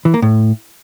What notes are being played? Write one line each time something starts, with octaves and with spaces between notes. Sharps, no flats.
E3
A#3
A2